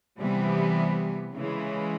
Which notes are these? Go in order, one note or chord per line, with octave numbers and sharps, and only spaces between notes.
C3 E3 G3 B3
C#3 E3 G#3